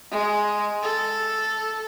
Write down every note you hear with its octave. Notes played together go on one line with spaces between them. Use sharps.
G#3
A4